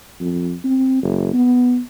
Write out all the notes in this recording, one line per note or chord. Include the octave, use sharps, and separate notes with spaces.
F2
C4
F#1
B3